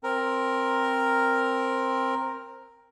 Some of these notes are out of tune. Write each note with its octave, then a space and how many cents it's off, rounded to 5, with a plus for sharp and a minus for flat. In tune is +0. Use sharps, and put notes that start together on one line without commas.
C4 +10 A#4 +0